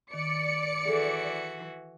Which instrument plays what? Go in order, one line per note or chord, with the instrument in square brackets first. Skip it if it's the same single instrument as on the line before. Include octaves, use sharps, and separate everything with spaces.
[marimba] D#3 [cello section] D5 [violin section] C#7
[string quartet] E3 F#4 [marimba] G#4 A4